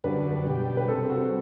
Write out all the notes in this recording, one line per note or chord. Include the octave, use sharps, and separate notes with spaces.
F#2 D3 G3 D4 F#4 B4
B2 G3 D4 G4
B4
C3 G3 C4 A4
F#4